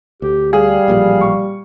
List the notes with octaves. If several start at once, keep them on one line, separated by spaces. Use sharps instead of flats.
D2 G4
G3 G#4 F5
A1 A#2 F3
C#6